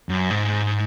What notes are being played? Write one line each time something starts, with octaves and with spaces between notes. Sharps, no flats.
F#2
G#2